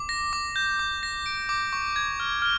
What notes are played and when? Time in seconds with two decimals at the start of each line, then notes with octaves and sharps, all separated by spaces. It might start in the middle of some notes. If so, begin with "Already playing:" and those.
Already playing: D6
0.09 A#6
0.33 D6
0.56 G6
0.79 D6
1.03 A#6
1.26 D7
1.49 D6
1.73 C#6
1.96 G#6
2.20 F6
2.42 F6